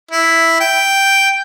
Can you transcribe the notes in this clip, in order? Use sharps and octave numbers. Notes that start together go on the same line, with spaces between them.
E4
G5